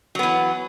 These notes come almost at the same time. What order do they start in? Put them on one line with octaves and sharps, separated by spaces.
F#3 B3 E3